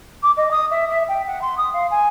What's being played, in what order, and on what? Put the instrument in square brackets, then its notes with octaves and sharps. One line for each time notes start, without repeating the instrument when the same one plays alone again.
[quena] D6
D#5
D#6
E5
E5
G5
F#5
C6
D#6
F5
G#5